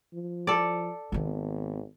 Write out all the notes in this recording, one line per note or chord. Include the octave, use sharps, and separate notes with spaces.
F3
A4 D5
G#1 D#3 B3